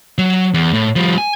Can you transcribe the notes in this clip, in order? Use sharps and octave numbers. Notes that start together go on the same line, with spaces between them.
F#3
E2
A2
F3 G3
G#5